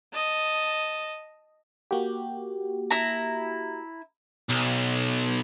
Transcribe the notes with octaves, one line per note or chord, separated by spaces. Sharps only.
D#5 A5
A#3 F#4 G4
E4 A#5
B1